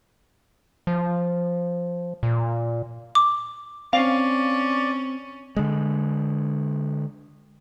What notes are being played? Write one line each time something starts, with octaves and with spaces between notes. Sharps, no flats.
F3
A#2
D6
C4 C#4 D5 F5
D3 G#3